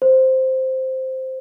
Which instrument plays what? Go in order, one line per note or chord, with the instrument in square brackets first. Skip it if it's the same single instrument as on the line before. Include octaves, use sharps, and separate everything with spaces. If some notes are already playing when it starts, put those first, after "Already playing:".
[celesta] C5